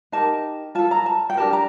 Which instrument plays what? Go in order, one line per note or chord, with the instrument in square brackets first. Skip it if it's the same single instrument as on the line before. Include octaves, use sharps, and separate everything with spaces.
[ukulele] D#4 G4 A#4 A5
F4 A4 A5
A#5
A5
G5
D4 G4 A#4 A5
A#5